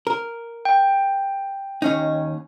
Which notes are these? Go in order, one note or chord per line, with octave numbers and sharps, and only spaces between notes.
A#4
G5
D#2 C#4 D#4